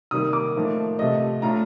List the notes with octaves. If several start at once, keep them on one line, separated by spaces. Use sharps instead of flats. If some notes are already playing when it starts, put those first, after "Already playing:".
C3 D#3 G3 A#3 D#6
D6
A2 F3 A#3 D#4
C3 F3 A3 D#5
A2 A3 D4 F4 A#5